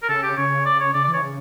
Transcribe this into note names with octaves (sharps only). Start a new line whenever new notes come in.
A#4
C#3 A4
G4
C#3 C#5
D5
C#5
C#3 D5
D5
E3 C#5
C#3